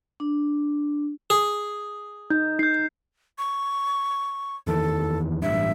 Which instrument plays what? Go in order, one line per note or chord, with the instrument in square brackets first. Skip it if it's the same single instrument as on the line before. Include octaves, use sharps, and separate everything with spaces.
[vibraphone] D4
[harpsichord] G#4
[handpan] D#4 [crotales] G6
[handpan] D#4 [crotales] G6 C7
[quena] C#6
[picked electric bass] E2 D#3 E3 [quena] A4
[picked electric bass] A1 G2 [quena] E5